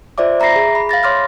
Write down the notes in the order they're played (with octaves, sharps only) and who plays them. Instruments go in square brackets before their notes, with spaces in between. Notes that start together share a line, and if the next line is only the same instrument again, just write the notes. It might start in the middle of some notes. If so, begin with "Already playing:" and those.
[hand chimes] F4 C5 D5 E5 D6
E5 A#5 B5 A#6 C7
G#4
B5
F5 B5 A6 A#6
C#5 C6 D6 F6 A6